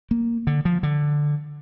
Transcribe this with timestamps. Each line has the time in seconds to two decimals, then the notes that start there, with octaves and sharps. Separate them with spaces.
0.11 A#3
0.47 D3
0.65 F3
0.83 D3